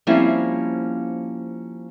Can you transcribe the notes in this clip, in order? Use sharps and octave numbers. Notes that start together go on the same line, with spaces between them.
F3 G3 A#3 C4 C#4 E4